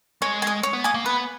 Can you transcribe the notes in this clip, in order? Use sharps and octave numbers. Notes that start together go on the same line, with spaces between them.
G#3 C#5
G#5 D#6
C#5
B3
A#3 G#5 D#6
A#3
B3 B4